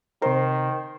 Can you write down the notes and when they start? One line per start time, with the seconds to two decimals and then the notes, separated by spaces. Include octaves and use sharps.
0.22 C3 D#3 A#4 C5